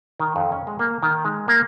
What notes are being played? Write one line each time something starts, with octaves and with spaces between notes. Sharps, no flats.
D#3
F2
C#4
G#3
A#3
D#3
G#3
A#3